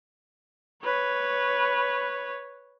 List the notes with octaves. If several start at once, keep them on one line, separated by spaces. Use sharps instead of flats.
B4 C#5